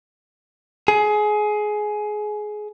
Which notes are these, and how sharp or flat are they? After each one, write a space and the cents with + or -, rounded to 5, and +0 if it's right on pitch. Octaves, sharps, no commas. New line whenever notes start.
G#4 +20